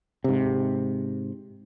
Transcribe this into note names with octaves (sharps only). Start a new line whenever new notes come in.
G#2 C3